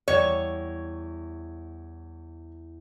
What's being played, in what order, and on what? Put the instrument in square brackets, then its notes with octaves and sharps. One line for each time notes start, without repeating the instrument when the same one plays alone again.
[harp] E2 G3 E7 [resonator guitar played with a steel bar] C#5